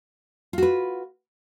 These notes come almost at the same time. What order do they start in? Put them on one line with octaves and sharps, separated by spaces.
F4 F#4 B4